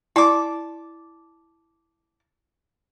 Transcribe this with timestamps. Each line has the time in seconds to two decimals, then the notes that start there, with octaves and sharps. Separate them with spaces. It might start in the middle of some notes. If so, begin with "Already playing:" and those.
0.16 E4 D5 A5 D6